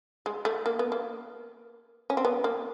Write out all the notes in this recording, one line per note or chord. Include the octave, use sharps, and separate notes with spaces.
G#3
A3
A#3
B3
A#3
C#4
C4
B3
A#3